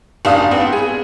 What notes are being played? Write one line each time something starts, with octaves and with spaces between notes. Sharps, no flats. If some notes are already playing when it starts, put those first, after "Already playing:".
F#1 D4 F5 D#6
B3 C4
G#4